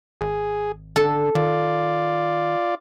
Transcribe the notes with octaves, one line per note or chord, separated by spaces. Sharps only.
G#1 G#4
D3 A4
D#3 F4 D5